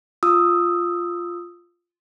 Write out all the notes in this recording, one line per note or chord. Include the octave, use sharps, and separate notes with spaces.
F4 D#6 E6